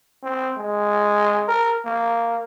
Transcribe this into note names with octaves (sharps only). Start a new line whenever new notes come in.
C4
G#3
A#4
A#3